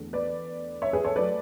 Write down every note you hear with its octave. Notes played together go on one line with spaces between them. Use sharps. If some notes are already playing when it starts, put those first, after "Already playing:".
Already playing: E2 D3 A3
B4 D5
C#5 E5
G#4 B4
A4 C#5
F#3 A3 B4 D5